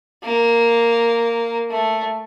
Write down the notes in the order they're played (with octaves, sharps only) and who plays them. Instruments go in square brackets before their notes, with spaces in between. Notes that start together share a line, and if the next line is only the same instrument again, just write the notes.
[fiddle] A#3
A3